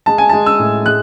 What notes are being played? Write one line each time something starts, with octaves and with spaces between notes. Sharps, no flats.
G#3 A5
G#5
G#3 A5
E6
A2
G#3 F#6